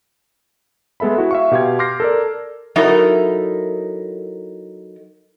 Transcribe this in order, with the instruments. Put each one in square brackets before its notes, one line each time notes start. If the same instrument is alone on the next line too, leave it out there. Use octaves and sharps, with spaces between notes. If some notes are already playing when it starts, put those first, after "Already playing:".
[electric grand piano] G#3 B3 A4 E5 B5
E4 F#4
E5 F5 C#6
B2 G4 F5 C6 G#6
C6 D6 F6 G6 A#6 C7
A4 A#4 D5
[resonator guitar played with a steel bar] F#3 D#4 E4 A4 A#4